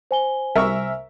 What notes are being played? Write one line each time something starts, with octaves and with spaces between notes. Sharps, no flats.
C5 G#5 G7
C2 A#4 E5 C#6 E6